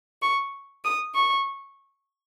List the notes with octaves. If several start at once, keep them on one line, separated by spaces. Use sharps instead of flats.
C#6
D#6
C#6